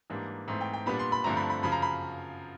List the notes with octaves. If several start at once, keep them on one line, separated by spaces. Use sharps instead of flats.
G#2 E3 G3 A#3 D4
G#2 E3 A3 C4
G5
G5
A#2 G3 B3 D4 B5
C6
B5
G2 D3 F3 A3 C4 A#5
B5
B5
F#2 C#3 F3 B5
A#5
B5